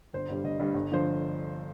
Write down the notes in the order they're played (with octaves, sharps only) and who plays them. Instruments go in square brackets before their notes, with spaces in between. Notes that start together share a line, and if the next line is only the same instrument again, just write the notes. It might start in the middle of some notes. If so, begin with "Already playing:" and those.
[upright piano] G1 C5
G2 D3 G3
G1 D#5
G2 D3 G3
G1
D3 F3 C5